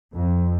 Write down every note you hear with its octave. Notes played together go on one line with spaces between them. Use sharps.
F2